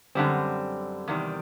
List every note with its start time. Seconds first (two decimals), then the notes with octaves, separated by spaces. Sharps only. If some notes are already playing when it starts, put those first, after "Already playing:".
0.15 F#2 D3 G3 C4
1.08 E2 C3 D#3 G3